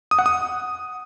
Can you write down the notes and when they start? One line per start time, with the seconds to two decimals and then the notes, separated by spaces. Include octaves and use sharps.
0.11 D#6
0.19 F#5
0.26 D#6